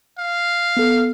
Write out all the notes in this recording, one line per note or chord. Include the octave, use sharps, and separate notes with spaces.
F5
B3 A4